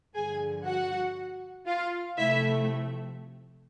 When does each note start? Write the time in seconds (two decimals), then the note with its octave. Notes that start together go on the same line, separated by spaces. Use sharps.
0.15 G2 D3 F3 G#4 G#5
0.65 F#4 F#5
1.66 F4 F5
2.17 C3 F3 A3 E4 E5